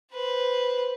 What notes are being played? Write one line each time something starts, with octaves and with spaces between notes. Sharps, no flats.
B4 C5